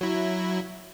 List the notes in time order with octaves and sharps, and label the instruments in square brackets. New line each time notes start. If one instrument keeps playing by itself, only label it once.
[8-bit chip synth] F#3 E4